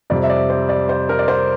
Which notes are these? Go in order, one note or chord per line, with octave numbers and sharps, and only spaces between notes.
F2 C3 G3 D5
E5
D5
C5
D5
C5
A#4
D5
C5